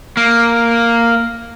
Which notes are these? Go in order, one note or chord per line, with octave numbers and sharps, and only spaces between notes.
A#3